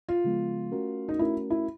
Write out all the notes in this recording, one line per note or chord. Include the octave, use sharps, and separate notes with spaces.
F4
C#3 F3 G#3 B3
A3 C#4 F#4 A#4
D#4
A3 C#4 E4 F#4 A#4
E4